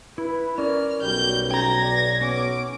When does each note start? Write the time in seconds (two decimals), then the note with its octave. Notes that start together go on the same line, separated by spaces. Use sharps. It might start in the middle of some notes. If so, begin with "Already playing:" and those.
0.18 E4 B4
0.58 C#4 A#4 D5 F6
1.02 B1 G3 G6
1.51 G5 A#5 G#6 A#6
1.82 D5
2.21 B3 C#4 D6